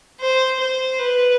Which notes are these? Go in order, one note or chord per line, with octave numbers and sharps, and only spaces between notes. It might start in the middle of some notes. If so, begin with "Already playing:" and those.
C5
C5
B4